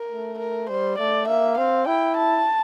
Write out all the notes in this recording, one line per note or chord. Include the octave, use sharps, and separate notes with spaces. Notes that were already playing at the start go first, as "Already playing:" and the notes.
Already playing: A#4
A3
A#4
G3 C5
A3 D5
A#3 E5
C4 F5
E4 G5
A5